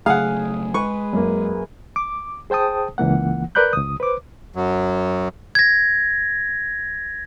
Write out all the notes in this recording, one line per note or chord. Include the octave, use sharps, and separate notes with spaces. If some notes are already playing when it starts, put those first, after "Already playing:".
C#3 F#3 A3 G#4 F5 F#5
G#3 B4 C#6
F#2 A#3
D6
G#4 C5 G5 A5 D#6
C#2 E3 A#3 F#5
A#4 B4 D5 B5 F#6 G6
C#2 D#6
B4 C5 D6
F#2 F#3
G#6 A#6